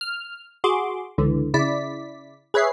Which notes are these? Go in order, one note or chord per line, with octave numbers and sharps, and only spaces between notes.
F6
F#4 G#4 C6 D6
C#2 D3 E3
C#3 E4 D5 B6
G#4 B4 C#5 E5 C7